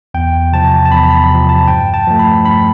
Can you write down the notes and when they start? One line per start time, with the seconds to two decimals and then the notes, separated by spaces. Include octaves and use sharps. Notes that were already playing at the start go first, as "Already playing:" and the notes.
0.14 E2 G5
0.52 C3 F3 A5
0.85 A5
0.91 E2 B5
1.11 B5
1.30 C3 F3
1.49 A5
1.68 G2 G5
1.94 A5
2.07 F3 A3
2.19 B5
2.45 G2 B5